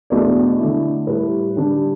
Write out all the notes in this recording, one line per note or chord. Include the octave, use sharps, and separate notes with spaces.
E2 B2 A3 D4 D5
D3 A3 E4
A2 G3 E4 B4
D3 G3 D4